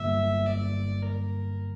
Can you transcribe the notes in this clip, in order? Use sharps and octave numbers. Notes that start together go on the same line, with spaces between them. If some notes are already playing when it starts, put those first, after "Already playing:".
Already playing: G2 D3 G3 A#3 E5
D5
A#4